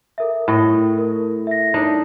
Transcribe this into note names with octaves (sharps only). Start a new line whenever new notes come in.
A4 A#4 E5
A2 D#5
A#4
E5 A#6
D4 D#4